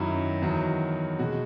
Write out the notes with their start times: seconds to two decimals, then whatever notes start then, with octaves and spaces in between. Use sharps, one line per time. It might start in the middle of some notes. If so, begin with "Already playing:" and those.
Already playing: F#2 D#3 F#3 E4
0.42 E2 D#3 F#3
1.19 B2 G#3 F#4